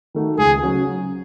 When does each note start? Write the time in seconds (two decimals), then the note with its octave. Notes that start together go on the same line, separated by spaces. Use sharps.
0.14 D#3 A3 D#4 F#4
0.38 C#2 G#4
0.62 C#3 F#3 C#4 F#4